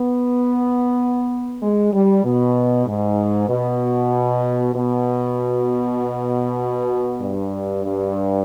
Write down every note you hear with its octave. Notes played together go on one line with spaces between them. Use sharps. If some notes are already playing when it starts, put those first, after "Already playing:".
Already playing: B3
G#3
G3
B2
G#2
B2
B2
G2
G2